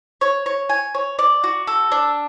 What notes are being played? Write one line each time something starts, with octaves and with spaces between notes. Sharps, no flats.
C#5
C#5
G#5
C#5
D5
F#4
A4
D4